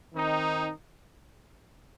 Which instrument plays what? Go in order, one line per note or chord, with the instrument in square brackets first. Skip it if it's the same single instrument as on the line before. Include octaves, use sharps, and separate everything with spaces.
[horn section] D#3 C4 D#4